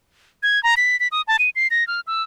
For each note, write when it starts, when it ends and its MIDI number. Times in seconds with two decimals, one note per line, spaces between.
0.43 0.62 92
0.63 0.75 82
0.77 0.99 95
1.00 1.08 95
1.12 1.22 87
1.28 1.37 81
1.39 1.50 99
1.56 1.67 96
1.71 1.86 94
1.87 2.00 89
2.07 2.23 88